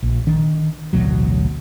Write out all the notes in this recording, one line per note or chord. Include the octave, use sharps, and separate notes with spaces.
A#1
D#3 D4
A1 D2 B2 F#3